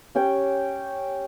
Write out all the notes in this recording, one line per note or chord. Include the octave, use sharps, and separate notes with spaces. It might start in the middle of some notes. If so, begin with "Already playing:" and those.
C#4 G4 C#5 G5